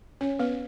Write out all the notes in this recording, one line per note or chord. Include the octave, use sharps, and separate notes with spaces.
C#4 C#5
B3 B4